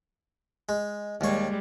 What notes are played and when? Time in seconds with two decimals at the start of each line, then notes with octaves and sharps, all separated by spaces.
0.69 G#3
1.21 D#2 G3 G#3 C#5